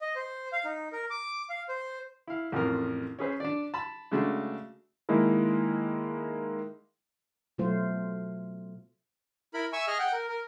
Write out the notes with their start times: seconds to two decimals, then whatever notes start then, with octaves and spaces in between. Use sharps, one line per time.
0.01 D#5
0.16 C5
0.53 F5
0.65 D#4
0.93 A#4
1.10 D6
1.50 F5
1.69 C5
2.27 E4 F5
2.52 A1 F2 F4 A#4
3.19 C#4 G#4 B4 C5
3.40 D4 D5
3.74 A5 B5
4.12 C#3 G#3 A3 D4 F#4
5.09 D#3 G#3 A#3 D#4 E4 A#4
7.58 B2 F#3 A3 F4 C5
9.54 E4 A#4 B5
9.73 E5 G#5 C#6 E6
9.88 G#4 D#5 G#5 F6
9.99 F#5 G5
10.12 A#4
10.29 A#4